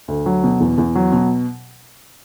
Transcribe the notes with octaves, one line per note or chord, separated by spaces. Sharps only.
D2
F#3
B2
E2
E2
F#3
B2